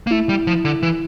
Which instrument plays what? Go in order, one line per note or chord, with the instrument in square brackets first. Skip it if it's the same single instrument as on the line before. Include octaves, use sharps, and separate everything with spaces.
[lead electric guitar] A#3
[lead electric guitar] A3 [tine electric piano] E4
[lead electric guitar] G3
F3
D3
E3